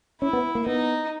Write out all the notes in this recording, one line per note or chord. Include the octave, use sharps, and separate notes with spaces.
C#4 E4
B3
A#3
B3 D#4